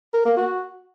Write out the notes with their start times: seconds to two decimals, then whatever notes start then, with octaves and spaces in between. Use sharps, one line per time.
0.14 A#4
0.25 A#3
0.37 F#4